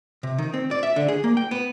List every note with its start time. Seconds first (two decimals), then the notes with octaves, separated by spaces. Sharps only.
0.23 C3
0.38 D#3
0.54 C4
0.71 D5
0.83 E5
0.96 D3
1.08 G#4
1.24 A#3
1.37 G5
1.51 B3